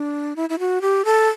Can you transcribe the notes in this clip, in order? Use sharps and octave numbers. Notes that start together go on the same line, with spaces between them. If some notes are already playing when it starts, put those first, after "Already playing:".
Already playing: D4
E4
E4
F#4
G4
A4